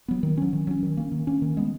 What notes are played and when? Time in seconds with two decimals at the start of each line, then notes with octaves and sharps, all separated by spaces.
0.08 F#3 B3
0.23 D#3
0.37 F#3 C#4
0.53 D#3
0.67 F#3 C#4
0.83 D#3
0.97 A#3 C#4
1.12 D#3
1.27 A#3 C#4
1.42 D#3
1.57 G#3 B3